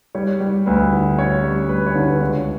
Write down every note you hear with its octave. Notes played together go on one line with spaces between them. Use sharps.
G3 C#5
G3
D2 B4
D3
C#4 C#5
G3
D2 B4
C#5
D3
B4
C#2 C#5